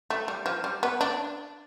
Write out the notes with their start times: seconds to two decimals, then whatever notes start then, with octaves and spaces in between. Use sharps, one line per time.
0.10 A3
0.28 G3
0.46 F3
0.64 G3
0.83 B3
1.01 D4